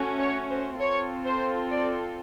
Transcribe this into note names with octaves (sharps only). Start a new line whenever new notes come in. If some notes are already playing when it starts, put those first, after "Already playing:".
Already playing: A3 C#4 F#4
C#5
C5
C4 F4 A4 C#5
C5
D5